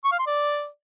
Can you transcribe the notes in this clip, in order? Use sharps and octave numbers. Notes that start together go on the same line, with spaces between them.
C#6
F5
C6
D5